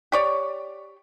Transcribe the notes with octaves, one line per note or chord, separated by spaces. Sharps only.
G4 C#5 D5